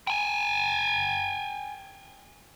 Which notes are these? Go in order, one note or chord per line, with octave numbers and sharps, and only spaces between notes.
G5 G#5